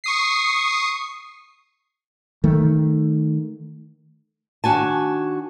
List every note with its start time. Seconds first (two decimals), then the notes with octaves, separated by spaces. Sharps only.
0.04 C#6 D#6 C7
2.44 D#3 A3
4.64 D#3 D4 F#4 G#5 A5